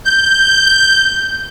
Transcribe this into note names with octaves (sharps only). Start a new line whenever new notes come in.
G6